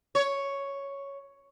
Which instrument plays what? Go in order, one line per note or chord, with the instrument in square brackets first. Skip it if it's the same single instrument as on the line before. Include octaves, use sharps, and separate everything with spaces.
[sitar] C#5